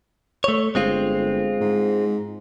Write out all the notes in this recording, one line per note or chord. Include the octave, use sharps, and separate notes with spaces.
A3 C#5
G1 G#3 C4 F4
G#2